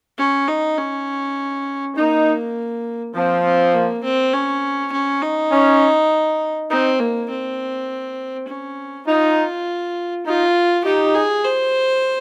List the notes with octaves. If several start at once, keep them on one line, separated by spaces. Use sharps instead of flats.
C#4
D#4
C#4
A#3 D#4
F3 C4
C4
A#3
C4
C#4
C#4
D#4
C#4
C4 D#4
A#3
C4
C#4
D#4 F4
D#4 F4
D#4 G4
G#4
C5